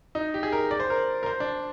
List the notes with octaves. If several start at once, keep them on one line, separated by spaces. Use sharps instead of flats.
D#4
G4
G#4
A#4
D5
C5
A#4
A#4
C5
D4